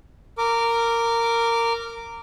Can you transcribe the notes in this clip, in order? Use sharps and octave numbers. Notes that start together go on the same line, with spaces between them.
A#4 D6